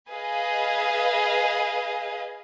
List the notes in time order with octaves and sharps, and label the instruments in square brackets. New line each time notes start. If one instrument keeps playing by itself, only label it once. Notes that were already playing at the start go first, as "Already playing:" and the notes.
[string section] G#4 B4 D#5 F5